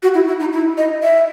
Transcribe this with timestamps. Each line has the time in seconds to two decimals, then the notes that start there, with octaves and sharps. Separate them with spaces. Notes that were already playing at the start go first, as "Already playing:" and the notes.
0.03 F#4
0.14 E4
0.27 E4
0.40 D#4
0.53 E4
0.77 D#5
1.03 E5